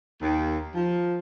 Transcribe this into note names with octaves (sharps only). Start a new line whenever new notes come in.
D#2
F3